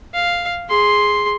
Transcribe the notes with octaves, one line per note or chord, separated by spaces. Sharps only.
F5
G#4 C6